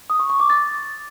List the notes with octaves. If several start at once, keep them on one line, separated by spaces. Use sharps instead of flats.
D#6
C#6
C#6
D6
A6